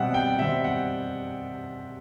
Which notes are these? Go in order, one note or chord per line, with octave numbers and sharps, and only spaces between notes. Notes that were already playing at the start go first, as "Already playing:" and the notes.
Already playing: B2 G3 C4 E5 F#5
G5
B2 G3 C4 E5
F#5